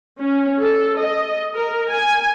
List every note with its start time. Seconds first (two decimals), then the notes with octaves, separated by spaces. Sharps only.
0.19 C#4
0.60 A4
0.99 D#5
1.55 A#4
1.89 G#5